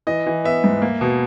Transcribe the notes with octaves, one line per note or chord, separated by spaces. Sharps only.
E3 D#5
E3
B3 E5
G#2
A#3
B2